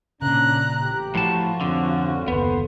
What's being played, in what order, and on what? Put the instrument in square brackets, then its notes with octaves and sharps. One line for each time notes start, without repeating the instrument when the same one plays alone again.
[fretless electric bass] A#2 C#3 [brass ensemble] C#4 D4 [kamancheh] A#5 F#6
[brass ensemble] A1 G4
[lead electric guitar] A2 A5 [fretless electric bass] F3 [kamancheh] F4 F#4
[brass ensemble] F2 G#2 C#4 [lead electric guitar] D3
[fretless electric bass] F#1 D#2 [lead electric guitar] B3 [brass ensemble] A4 B4 C5